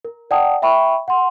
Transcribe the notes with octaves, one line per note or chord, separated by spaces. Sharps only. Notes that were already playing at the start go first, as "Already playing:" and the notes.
A#4
D5 F#5 G5 A5 D#6
E5 G5 B5 C#6
F#5 C6